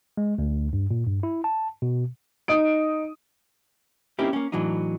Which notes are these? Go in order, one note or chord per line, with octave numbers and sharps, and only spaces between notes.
G#3
D2
G2
A#2
G2
E4
A5
B2
D#4 D#6 D7
A#3 C4 C#4 D#4 E4 G4
A#3 C#4
A2 E3 F#3 D4 D#4